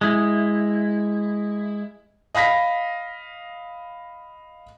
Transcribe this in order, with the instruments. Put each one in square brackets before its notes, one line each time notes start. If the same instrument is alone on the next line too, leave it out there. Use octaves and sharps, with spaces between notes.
[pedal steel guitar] G#3 E4
[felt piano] D#5 F5 B5 A#6 B6